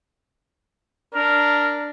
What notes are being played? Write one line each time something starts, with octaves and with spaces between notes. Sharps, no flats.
D4 A#4